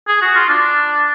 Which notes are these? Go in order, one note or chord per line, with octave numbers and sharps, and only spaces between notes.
G#4
F#4
F4
D4